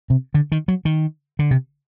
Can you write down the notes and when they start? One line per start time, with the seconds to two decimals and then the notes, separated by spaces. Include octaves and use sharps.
0.10 C3
0.34 D3
0.52 D#3
0.68 F#3
0.85 D#3
1.39 D3
1.51 C3